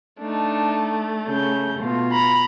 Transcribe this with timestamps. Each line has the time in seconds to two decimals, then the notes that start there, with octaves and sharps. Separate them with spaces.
0.20 A3 D4 D#4
1.27 C#3 G6
1.79 B2 F4
2.12 A#5 B5